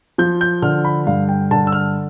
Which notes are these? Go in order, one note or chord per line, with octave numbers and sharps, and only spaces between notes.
F3 G6
G6
D3 F6
B5
G2 F5
G5
D3 A5
E6
F6